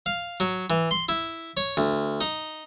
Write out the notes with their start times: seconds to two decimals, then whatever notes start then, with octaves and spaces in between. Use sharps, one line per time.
0.06 F5
0.40 F#3
0.70 E3
0.91 C6
1.09 E4
1.57 C#5
1.77 D2
2.21 D#4